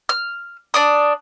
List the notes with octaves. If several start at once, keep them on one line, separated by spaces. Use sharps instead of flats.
F6
D4 D5 D#6